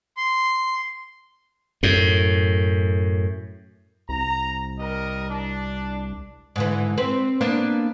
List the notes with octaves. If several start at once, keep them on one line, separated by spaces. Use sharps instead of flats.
C6
F#2 A2
C2 A#5
G3 A#4 D#5
D4
G#2 D3 E3
C4 B4
A#3 B3 D4